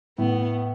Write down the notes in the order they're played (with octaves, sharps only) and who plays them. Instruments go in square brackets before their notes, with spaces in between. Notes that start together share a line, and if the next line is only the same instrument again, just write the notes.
[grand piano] A2 [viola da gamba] B3